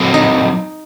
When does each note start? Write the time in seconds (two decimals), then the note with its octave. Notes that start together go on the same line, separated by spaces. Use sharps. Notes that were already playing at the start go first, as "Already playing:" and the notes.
Already playing: F#3 C4 F#4 A4
0.14 D#4